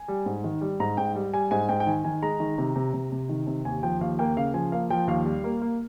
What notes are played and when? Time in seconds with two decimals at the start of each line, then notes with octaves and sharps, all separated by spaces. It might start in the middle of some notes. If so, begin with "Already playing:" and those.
Already playing: G#5
0.08 G3
0.26 G#2
0.44 D#3
0.61 G3
0.80 G#2 A#5
0.97 G#2 G5
1.15 G3
1.33 G3 G#5
1.51 G#2 G#5
1.69 G#2 G5
1.80 G5
1.87 D#3 G#5
2.04 D#3 G#5
2.22 G#3 A#5
2.40 D#3
2.58 C3
2.76 C3
2.94 C3
3.12 C3
3.29 D#3
3.47 C3
3.65 D#2 G#5
3.83 F3 G5
4.01 D#2 F5
4.19 A#3 G5
4.37 C#3 F5
4.54 F3 G#5
4.72 A#3 F5
4.90 F3 G5
5.08 D#2 F5
5.26 G3
5.44 A#3
5.62 A#3